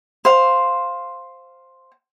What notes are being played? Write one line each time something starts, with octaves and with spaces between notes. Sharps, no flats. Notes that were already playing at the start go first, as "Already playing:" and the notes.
C5 F5